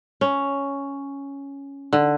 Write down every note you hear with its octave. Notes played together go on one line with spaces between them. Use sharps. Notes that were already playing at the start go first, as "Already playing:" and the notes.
C#4
D3